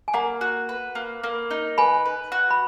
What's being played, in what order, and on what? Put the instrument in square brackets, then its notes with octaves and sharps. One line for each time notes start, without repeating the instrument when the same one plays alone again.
[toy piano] G#5
[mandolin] A#3 [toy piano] F#5 A#5
[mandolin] F#4
B4
A#3
A#3
D#4
[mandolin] B4 [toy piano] G#5 B5
[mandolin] B4
F#4
[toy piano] B5